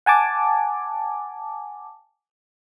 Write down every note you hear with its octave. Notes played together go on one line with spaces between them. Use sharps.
F#5 G#5 A5 D6